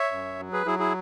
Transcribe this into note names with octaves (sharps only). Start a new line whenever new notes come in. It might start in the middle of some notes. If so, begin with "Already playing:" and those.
Already playing: C#5 E5
F#2
F#3
G#4 B4
F#3 E4 G#4
E4 G#4